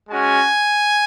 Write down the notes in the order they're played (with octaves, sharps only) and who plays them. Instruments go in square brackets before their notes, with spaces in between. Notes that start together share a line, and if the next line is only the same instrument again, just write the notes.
[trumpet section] G#3 C#4 F#4 G#5